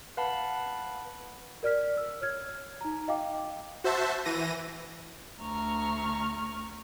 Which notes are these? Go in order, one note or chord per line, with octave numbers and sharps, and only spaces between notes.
B4 F5 F#5 A5 B5
A#4 D5 F6 B6
E6
C#5 F6 G#6
D#4 A#5
D#5 F5 G5 D6
F#4 C5 E5 A5
E3 A#6 D#7
D2 A#5 C#6 F6